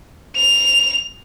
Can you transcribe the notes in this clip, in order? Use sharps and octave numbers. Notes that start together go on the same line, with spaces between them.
F7